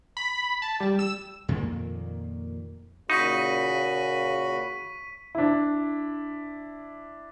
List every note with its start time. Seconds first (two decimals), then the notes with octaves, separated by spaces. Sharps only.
0.17 B5
0.62 A5
0.80 G3
0.99 E6
1.48 F2 A#2 D#3 A#3
3.10 A#2 C#3 D#4 F#4 B5 C#6 B6 D#7
5.35 D4 E4